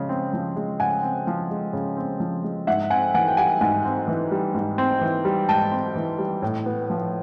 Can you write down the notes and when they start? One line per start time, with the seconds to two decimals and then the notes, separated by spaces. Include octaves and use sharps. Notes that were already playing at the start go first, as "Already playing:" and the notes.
Already playing: C#3 F3 G#3
0.09 C4
0.33 F3
0.56 G#3
0.80 C#3 F#5 G#5
1.03 C4
1.27 F3
1.51 G#3
1.73 C#3
1.97 C4
2.20 F3
2.44 G#3
2.67 G#2 E5 F#5
2.90 C4 F#5 G#5
3.14 E3 F#5 G#5
3.28 G5
3.37 G3 F#5 G#5
3.61 G#2 F#5 G#5
3.85 C4
4.08 E3
4.31 G3
4.55 G#2
4.78 C4
5.01 E3
5.25 G3
5.49 G#2 G5 A5
5.72 C4
5.96 E3
6.19 G3
6.42 A2
6.66 B3
6.90 F3